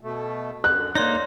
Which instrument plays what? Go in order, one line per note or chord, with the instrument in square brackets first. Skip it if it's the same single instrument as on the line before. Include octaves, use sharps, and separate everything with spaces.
[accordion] B2 A3
[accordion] F#2 D3 [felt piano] F#6
[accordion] G#2 [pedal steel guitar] A#3 D#4 [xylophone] C#5 D5 C6